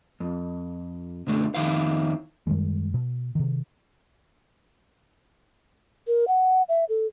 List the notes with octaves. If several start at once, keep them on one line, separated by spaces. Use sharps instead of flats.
F2
B1 F#2 D3 A3
F2 C3 D#3 E4 F5
F#2 D#3 G3 G#3
B2
C3 D#3
A#4
F#5
E5
A4